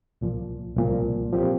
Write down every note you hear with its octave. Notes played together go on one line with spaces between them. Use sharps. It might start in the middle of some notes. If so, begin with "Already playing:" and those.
C2 A#2 F3
C2 A#2 F3
A#2 F3 C4 G4